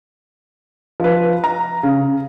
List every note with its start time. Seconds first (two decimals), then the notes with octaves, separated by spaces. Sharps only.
1.00 F3 B4
1.44 A#5
1.83 C#3